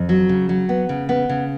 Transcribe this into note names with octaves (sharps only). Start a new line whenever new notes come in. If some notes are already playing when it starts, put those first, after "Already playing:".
Already playing: F2
F#3
C#3
F#3
B3
C#3
B3
C#3